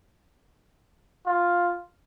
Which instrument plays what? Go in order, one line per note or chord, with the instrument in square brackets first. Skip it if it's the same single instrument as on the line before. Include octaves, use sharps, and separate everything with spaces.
[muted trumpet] F4